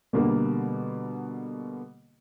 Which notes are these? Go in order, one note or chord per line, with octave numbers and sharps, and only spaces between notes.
B2 D3 G3 A#3